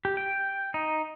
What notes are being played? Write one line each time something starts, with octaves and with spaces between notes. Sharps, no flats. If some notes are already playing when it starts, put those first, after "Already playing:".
G4
G5
D#4